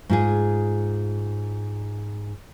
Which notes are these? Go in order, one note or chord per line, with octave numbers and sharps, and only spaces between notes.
G#2 F4 G#4